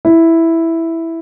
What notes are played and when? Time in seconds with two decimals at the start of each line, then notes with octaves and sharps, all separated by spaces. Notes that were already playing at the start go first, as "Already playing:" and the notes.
0.05 E4